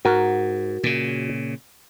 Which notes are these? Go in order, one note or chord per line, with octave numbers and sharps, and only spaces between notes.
G#2 F#4 A#4
A#2 C#3